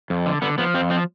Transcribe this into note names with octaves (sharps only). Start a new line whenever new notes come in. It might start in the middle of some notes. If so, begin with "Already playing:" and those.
F2
D3
D3 B3
F3 B3
F2 C4
F3 C4